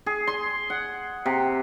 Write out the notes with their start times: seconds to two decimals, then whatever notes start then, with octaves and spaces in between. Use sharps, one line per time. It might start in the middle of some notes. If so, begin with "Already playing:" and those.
0.06 G#4
0.27 C6
0.70 F#5
1.26 C3